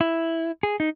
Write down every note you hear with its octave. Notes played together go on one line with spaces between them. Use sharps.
E4
G#4
D#4